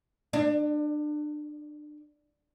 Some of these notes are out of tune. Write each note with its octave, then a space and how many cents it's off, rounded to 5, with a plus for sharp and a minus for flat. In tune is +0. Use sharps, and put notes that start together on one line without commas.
D4 +30